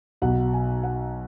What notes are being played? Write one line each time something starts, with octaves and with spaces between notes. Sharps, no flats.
B1 B2 F#3 F#5
G#5
F#5